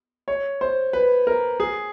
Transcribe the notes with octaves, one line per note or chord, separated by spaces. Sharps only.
C#5
C5
B4
A#4
G#4